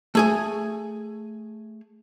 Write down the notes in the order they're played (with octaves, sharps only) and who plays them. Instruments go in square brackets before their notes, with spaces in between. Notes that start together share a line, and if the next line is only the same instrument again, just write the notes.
[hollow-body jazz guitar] A3 G#4 G#5